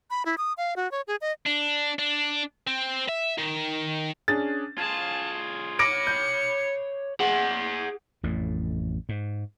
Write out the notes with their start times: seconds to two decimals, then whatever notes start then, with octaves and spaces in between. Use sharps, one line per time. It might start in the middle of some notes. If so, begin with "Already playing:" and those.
0.10 B5
0.26 E4
0.38 D#6
0.57 F5
0.76 F#4
0.91 C#5
1.07 G#4
1.21 D#5
1.47 D4
1.99 D4
2.67 C4
3.09 E5
3.38 D#3
4.28 C#4 D4 G#4 A6
4.78 F4 G#4 A5 G#6
5.79 C#5 B5 D6 A#6 C#7 D7
6.07 G6
7.20 G#4 F#5
8.23 A1 F2 A2
9.09 G#2